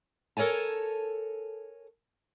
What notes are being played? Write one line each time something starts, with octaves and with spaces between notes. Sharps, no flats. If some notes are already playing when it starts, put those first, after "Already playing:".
A4 A#4 C#5 G#5 A5